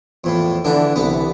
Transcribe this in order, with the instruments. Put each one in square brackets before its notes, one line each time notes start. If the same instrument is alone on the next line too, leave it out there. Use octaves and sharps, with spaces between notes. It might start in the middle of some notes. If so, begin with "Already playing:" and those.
[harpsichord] E2 A2 [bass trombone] F3
[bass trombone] D3 [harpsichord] E3 D4
[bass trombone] C2 [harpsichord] B3